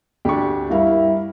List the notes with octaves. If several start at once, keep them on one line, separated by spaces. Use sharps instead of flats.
D2 D4 G4 C#6
G2 E4 A#4 F5